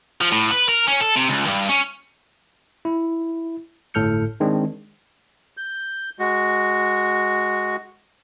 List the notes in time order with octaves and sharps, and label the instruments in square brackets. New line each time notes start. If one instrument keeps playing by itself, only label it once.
[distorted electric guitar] F3
A2
B4
A#4
C#4
A4
C3
C#2
G2
C#4
[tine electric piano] E4
G1 A2 A4 F6 G6 C#7
D#3 G#3 C4 D4
[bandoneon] G6
G#3 F#4